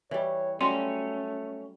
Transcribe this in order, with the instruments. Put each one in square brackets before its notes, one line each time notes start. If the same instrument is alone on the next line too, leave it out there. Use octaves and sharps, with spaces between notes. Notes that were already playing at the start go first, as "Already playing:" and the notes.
[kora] E3 G3 [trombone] C#5
[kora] F#3 G3 [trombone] A3 [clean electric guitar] C#4 [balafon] C6